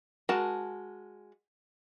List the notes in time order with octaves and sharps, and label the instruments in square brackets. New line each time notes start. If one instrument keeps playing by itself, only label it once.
[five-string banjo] G#3 F#4 A#4 A5